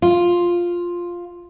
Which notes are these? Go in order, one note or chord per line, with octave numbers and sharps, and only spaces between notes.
F4